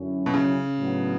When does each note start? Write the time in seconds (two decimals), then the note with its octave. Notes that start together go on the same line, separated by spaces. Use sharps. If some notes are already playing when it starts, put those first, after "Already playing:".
Already playing: F#2 D3 F#3 C#4 E4
0.26 B2
0.34 C#3
0.78 A2 F#3 B3 D4